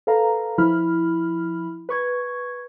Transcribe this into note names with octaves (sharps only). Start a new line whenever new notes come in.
A4 B4 F5 A#5
F3 E4 B5 F6
B4 C#6 G#6